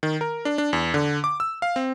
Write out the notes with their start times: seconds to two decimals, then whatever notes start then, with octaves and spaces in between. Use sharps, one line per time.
0.03 D#3
0.21 A#4
0.45 D4
0.58 D4
0.73 E2
0.94 D3
1.24 D6
1.40 E6
1.62 F5
1.76 C4